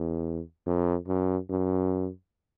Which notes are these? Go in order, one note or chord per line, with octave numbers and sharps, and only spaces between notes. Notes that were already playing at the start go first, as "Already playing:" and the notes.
Already playing: E2
F2
F#2
F#2